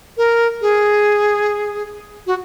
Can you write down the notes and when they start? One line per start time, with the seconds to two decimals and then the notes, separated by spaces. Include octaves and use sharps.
0.17 A#4
0.61 G#4
2.27 F#4